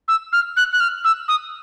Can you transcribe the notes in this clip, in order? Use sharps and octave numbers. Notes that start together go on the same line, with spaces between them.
E6
F6
F#6
F#6
F6
E6
D#6